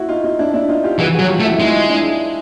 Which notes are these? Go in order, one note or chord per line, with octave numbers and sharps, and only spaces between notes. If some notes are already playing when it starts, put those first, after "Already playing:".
Already playing: E4 F#4
D#4 F4
D#4 F4
D4 E4
D4 E4
D#4 F4
F4 G4
E3 F#4 G#4
F#4 G#4
F#3
F4 G4
A3
E4 F#4
E4
G#3 D#4 F4
D4 E4